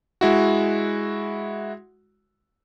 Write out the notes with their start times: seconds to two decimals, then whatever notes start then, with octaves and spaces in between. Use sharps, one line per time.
0.21 G#3 E4 F#4